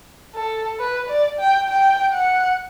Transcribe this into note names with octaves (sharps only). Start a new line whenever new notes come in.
A4
B4
D5
G5
G5
F#5